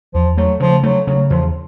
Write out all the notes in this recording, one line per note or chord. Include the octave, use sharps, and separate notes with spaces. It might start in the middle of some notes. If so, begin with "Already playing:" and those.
E2 F3
F#3 A3
C#3 F3
F#3 A3
C#3 F#3
E2 F3